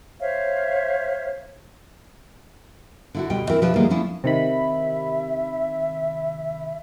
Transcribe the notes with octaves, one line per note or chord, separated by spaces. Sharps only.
C5 C#5 E5 F5
D3 E4 F#4
D2 B2 G3 G5
E3 C4 E4 A#4
B2 F3 D4 G4 B4 E5
D3 E3 G3 G#3 A#3 B3
F3 C#4 D4 E4
C3 D#3 E5 B5